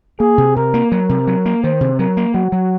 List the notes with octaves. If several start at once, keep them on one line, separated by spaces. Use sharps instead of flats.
A#3 G#4
C3
C3 A#4
A#3
F#3 A#4
C3
F#3
A#3
D#3 C5
C3
F#3 A#4
A#3
F#3 F#4
F#3